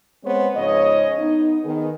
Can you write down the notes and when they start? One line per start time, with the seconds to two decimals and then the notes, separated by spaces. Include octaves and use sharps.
0.24 G#3 B3 C4 C5 C#5
0.55 G#2 C#3 F3 C#5 D#5
1.18 B3 D#4
1.64 D#3 B3 G#4